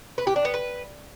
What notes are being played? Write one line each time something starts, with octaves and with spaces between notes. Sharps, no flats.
B4
G4
D4
B3
B4